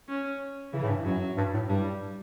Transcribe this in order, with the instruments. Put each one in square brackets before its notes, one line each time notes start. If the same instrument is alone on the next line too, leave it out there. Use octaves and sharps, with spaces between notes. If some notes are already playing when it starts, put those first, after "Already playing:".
[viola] C#4
[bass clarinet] C#3 [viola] E3
[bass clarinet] A2
G2
[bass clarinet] F#2 [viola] F#3
[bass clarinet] G2
A2
[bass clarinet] G2 [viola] G3